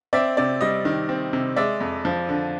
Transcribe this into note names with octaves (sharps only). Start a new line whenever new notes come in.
C4 D5 E5
C3 D5
G3 D#5
D#3
C4
C3
G#3 D5 E5
F2
F3
D3